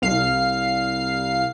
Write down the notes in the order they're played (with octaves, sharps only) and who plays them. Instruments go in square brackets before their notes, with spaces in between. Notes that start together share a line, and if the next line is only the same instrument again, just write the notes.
[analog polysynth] C2 F5 C7